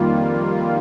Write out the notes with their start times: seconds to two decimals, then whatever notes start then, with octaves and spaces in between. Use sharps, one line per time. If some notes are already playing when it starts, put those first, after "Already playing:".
Already playing: F2 D#3 G3 A#3 F4